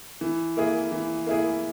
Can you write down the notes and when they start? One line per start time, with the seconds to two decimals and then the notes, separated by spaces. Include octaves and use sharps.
0.21 E3
0.57 A#3 E4 G#4
0.92 E3
1.26 A#3 E4 G#4